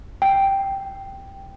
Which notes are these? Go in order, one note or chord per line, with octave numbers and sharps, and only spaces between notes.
G5